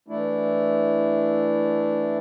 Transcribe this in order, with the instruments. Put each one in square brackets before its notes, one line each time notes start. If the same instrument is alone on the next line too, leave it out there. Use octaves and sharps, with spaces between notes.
[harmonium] E3 A3 D4 E4